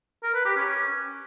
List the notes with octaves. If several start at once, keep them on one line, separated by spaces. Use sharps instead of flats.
A#4
B4
G4
C#4